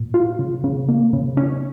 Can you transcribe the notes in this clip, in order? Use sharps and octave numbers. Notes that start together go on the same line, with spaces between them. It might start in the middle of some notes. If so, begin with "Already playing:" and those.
Already playing: A#2
F4
C#3
C#3
A#3
C#3
C#4